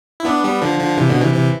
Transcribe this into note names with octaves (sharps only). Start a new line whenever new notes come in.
E4
B3 D4
G3 B3
D3 F3
D3 F3
C3 E3
B2 D3
C3 E3
C3 E3